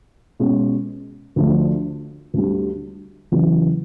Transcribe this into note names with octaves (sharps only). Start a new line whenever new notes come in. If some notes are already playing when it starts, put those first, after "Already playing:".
B2 G#3 C#4
D2 D3 F3 A3 D4
D2 D3 G3
E2 C#3 F#3